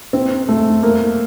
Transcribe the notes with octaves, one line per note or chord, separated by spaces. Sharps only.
C4
A3
A#3